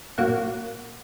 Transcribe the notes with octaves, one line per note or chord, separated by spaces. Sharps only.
A#2 F#3 A#3 F#5